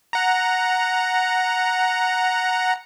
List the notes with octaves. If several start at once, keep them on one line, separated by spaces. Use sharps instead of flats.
F#5 A#5